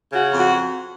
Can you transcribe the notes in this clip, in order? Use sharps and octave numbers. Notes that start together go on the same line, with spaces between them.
C#3 F#4
F2
F#4